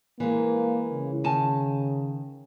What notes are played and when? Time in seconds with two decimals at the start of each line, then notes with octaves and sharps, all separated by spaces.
0.20 E3 G#3 A#3
0.92 C#3
1.24 D#3 G#5 A5